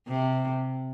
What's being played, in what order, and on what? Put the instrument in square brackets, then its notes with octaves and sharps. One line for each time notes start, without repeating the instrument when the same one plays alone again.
[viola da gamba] C3